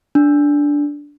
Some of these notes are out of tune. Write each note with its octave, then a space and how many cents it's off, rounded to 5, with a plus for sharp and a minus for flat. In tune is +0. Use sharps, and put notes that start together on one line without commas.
D4 -10